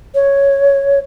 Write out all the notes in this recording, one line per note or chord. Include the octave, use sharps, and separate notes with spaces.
C#5